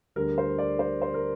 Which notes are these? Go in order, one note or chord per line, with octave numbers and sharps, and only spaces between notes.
D2 D3 G3 A#4
C5
D5
C5
C5
A#4